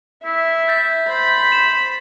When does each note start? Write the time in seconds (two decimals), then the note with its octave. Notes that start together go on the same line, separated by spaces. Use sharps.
0.25 E4 E5
0.68 G6 A6 B6
1.09 C5 B5
1.52 E7